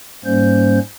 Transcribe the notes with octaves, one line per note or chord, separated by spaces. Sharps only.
G#2 G3 A#3 C#4 C5 G6